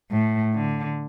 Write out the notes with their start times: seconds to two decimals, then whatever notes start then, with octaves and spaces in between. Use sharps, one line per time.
0.11 A2
0.54 D3